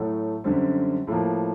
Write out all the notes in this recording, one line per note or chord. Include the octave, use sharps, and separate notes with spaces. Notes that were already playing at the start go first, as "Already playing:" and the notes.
Already playing: A2 F#3 A3
F#2 D3 G3 C4
A2 F3 A#3